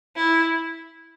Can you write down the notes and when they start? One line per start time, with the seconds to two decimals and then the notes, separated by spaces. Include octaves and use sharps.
0.16 E4